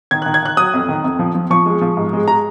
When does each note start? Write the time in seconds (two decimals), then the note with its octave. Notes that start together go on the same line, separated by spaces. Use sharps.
0.11 D#3 G#6
0.22 D#3 F#6
0.34 G#6
0.42 D#3 F#6
0.57 F#3 D#6
0.74 F2
0.89 D#3
1.04 F2
1.19 F3
1.35 F3
1.50 F3 C#6
1.66 G#3
1.81 F3
1.97 G#2
2.13 G#3
2.28 G#3 A#5